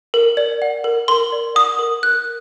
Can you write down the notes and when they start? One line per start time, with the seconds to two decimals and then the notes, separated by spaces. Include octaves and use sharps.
0.14 A#4
0.37 D5
0.62 F#5
0.84 A#4
1.08 A#4 C6
1.32 D5
1.55 F#5 D#6
1.79 A#4
2.03 A#4 F#6